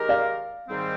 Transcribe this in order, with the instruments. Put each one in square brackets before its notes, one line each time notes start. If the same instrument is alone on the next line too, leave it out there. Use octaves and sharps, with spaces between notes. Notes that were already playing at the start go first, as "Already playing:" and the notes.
Already playing: [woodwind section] D#3 G#3 D#4 G4 A#4
[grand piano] D5 F5
[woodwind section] G#2 D#3 G3 C4